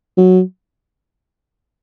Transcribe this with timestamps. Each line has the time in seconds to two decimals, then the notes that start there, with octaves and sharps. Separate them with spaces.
0.17 F#3